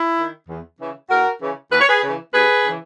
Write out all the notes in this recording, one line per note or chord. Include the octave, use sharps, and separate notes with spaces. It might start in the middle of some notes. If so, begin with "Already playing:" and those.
Already playing: E4
D#3
E2
C#3 E3
E2 F#4 A#4
C#3 E3
D#2 B4
C#5
G#4 B4
C#3 E3
D#2 G#4 B4
C#3 E3